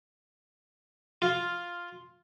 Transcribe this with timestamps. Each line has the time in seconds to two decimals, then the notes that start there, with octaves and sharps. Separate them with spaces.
1.22 F4